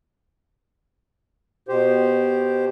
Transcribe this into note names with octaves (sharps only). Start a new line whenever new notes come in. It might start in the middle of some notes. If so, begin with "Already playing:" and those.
B2 G4 C5